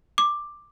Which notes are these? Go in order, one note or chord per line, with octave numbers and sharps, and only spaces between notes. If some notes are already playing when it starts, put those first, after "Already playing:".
D6